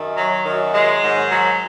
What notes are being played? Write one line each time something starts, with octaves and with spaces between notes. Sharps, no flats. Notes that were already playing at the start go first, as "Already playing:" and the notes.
Already playing: F#2 D#3
F#3
F#2 D#3 F#3
G#3
G#2 D#3 F#3
F#3